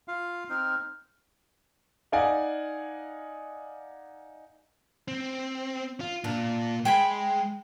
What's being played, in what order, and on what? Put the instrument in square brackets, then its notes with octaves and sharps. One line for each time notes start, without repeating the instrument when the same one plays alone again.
[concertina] F4 F5
[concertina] C4 D#4 [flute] F6
[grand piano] D#4 D5 F5 F#5 G#5
[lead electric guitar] C4
F4
[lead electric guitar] A#2 F4 [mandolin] D4
[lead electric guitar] G#3 [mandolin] G5 G#5 B5